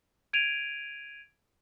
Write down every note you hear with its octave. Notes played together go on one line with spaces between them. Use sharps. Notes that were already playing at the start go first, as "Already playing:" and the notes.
G#6 D7 D#7 F7